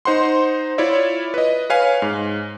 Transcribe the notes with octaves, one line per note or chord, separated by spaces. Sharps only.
D#4 C5 F#5 C6
E4 F4 C#5 D5 E5
B4 D#5
B4 C#5 F5 G#5
G#2